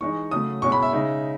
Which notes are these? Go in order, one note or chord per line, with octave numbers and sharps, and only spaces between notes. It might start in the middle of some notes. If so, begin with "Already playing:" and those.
E3 G#3 D#4 C#6
C#3 F#3 A3 D#6
B2 G#3 C#4 E4 C#6
B5
E5
C#3 G#3 D#4